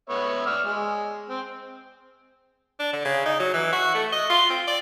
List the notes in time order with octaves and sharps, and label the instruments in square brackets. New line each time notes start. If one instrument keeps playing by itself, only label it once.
[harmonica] B3 C#5 E5
D5 E6 F6
G#3
C4
[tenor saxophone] D4
D3
C#3
D#4
F#3
E3
F#4
A3
D#5
F4
C4
D5